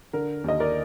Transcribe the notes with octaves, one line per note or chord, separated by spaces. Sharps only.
D3 A#4
D#2 D#5
A#4 D5